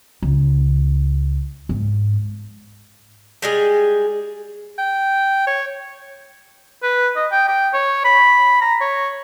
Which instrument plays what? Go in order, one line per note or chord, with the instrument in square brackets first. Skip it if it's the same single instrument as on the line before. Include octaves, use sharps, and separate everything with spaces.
[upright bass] C#2
G#2
[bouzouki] G3 G#3 G#4
[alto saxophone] G5
C#5
[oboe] B4
D#5
G5
G5
C#5
B5
A#5
C#5